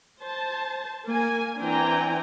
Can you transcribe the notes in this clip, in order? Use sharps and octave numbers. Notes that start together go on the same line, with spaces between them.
C5 A5
A#3 G#5
E3 C4 D4 G5 G#5 A#5